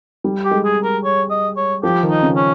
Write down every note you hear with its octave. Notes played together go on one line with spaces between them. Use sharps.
G3
G4
G#3
G#4
A#4
C#5
D#5
C#5
F3 G4
D#3
D#4
C#3
C#4